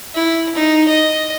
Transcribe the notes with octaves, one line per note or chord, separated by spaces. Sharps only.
E4
D#4
D#5